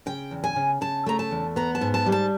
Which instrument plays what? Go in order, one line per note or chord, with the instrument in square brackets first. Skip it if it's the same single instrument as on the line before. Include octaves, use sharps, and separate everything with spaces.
[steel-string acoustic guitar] C#3 G5
E2
G#5
C#3
C#3 A5
A3 A#5
A5
E2
B3 A#5
A5
G#2
A5
G3
A5